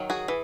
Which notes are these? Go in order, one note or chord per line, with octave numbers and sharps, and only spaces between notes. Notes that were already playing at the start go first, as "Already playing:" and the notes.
Already playing: D#3 F#3
F#4 G#4
E3